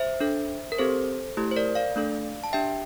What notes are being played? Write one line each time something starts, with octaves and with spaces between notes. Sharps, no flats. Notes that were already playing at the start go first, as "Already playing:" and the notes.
Already playing: C5 E5
D4 A4
A#4
C4 G4 A4 C5
A3 E4 G4
C5
A#4 D5
D5 F5
A3 D4 A4
A5
D4 G4 E5 G5